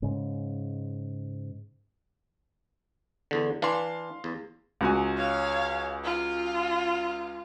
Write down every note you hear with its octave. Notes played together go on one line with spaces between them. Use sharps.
G#2 C#3
E2 D3
E3 D4 D5 F5 C6
E2
C#2 F#4 G#5
C#5 F5
F4